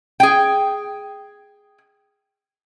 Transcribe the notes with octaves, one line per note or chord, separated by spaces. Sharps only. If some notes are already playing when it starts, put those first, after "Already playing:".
G#4 G5